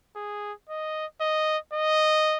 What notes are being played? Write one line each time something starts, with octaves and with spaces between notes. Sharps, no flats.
G#4
D#5
D#5
D#5